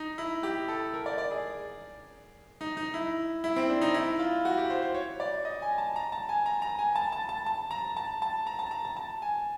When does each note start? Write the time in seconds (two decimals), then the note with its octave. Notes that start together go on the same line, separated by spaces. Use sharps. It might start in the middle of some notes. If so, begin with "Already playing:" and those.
Already playing: D#4
0.18 E4
0.43 G4
0.68 A4
0.94 A#4
1.06 D5
1.18 D5
1.31 G#4
2.61 D#4
2.77 D#4
2.94 E4
3.44 E4
3.56 C4
3.69 D4
3.81 D#4
3.94 E4
4.19 F4
4.45 F#4
4.57 G4
4.70 C5
4.82 C5
4.94 C#5
5.20 D5
5.45 D#5
5.62 G#5
5.78 A5
5.96 A#5
6.12 A5
6.29 G#5
6.46 A#5
6.62 A#5
6.79 G#5
6.96 A5
7.12 A5
7.29 A5
7.46 A5
7.71 A#5
7.97 A5
8.22 A5
8.47 A#5
8.59 A5
8.71 A#5
8.85 A5
8.96 A5
9.22 G#5